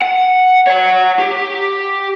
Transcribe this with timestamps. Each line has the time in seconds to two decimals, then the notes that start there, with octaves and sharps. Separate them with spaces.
0.02 F#5
0.67 C#5 F#5
1.19 G4